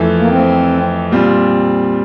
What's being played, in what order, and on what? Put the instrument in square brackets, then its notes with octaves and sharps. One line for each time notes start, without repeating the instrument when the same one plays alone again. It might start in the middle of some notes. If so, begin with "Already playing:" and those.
Already playing: [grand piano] F2 E3 A3
[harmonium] A#3
C4
[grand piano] A#2 G3 C4 F4